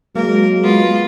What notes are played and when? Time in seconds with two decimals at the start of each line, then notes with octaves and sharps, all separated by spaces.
0.15 F#3 G#3 A#3 A#4
0.63 B3 F4